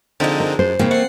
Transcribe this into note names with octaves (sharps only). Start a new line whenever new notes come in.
D3 F3 G#3 C4 D#4
A#4
F#2 C5
G#2 C#3 A#3 C4
A3 F#5 C7